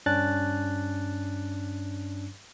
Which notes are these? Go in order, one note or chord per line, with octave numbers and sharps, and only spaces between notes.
G2 C#4 D4 F#6 A6